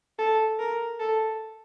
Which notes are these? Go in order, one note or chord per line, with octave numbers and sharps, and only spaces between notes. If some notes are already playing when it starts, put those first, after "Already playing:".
A4
A#4
A4